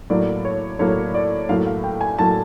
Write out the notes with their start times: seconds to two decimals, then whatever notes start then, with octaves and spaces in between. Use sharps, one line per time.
0.10 A2 F#3 A#3 D5
0.45 C#5
0.79 A2 F#3 A#3 C#5
1.14 D5
1.49 A2 F#3 A#3 F5
1.66 F5
1.84 G5
2.01 G#5
2.19 A2 F#3 A#3 A5